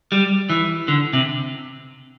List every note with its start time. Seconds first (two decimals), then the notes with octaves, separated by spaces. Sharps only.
0.12 G3
0.49 E3
0.88 D3
1.13 C3